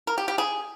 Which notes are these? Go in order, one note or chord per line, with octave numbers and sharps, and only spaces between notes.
A#4
G4
G4
G#4